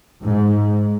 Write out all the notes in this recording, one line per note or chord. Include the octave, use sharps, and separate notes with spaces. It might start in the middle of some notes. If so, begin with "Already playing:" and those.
G#2